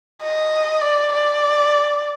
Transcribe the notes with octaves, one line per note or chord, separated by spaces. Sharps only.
D#5
D5
D5